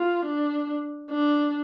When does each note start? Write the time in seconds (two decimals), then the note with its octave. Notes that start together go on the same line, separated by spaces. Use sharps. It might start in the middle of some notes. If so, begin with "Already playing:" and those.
Already playing: F4
0.27 D4
1.10 D4